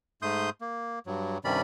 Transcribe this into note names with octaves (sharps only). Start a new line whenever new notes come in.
G#2 A3 C6 D#6 G6
A#3
G2 F#3
G2 C3 D#3 C#4 D5 B5